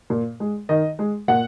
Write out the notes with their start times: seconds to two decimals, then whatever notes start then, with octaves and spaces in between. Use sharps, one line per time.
0.10 A#2
0.40 G#3
0.69 D#3 D#5
0.99 G#3
1.28 A#2 F#5